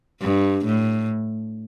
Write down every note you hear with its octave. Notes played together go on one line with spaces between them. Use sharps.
G2
A2